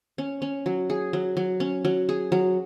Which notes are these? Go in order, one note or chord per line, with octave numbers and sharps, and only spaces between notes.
C#4
C#4
F#3
G#4
F#3
F#3
C#4
F#3
G#4
F#3